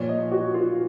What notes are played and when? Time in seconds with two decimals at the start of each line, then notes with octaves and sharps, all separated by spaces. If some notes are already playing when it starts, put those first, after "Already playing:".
Already playing: A#2 F3 A#3 C#5
0.09 D#5
0.32 F#4
0.54 F4